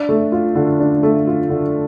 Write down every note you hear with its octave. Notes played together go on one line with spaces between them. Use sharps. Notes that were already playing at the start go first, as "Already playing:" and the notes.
Already playing: D4
A3
F4
D3
D4
A3
F4
D3